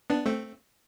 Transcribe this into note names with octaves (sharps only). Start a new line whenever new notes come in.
B3 D4
A3 C4